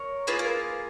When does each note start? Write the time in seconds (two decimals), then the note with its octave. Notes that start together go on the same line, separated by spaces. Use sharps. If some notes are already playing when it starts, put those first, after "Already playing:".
Already playing: A#4 C#5
0.27 A#3 F4 G#4 B4
0.39 A#4